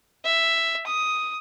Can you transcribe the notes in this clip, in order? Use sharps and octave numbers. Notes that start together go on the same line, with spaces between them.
E5
D#6